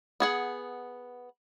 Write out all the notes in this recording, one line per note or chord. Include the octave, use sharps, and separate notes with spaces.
B3 G#4 F#5